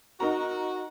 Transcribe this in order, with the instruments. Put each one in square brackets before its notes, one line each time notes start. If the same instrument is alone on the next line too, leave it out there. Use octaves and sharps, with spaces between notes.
[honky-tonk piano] D#4 A#4 A#5 [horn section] F#4